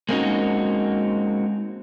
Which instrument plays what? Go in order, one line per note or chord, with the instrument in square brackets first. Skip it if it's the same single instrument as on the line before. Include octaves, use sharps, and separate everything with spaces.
[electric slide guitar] G#3 A#3 C4 C#4 D#4 F#4